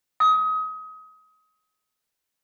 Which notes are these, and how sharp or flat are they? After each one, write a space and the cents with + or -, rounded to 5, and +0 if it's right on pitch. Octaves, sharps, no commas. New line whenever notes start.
D#6 +30